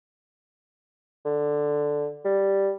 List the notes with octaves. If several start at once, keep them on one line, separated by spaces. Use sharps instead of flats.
D3
G3